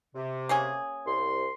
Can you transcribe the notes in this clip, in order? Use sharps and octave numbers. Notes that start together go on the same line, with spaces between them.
C3
A#3 C#4 G#4
C2 C6